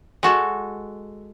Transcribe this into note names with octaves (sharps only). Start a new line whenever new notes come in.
G#3 F#4 A4